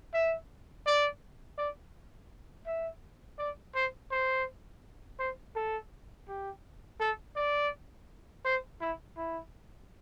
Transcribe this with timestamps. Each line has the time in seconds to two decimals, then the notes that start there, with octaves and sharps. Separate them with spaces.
0.13 E5
0.86 D5
1.58 D5
2.66 E5
3.39 D5
3.74 C5
4.11 C5
5.19 C5
5.56 A4
6.28 G4
7.00 A4
7.36 D5
8.45 C5
8.80 E4
9.17 E4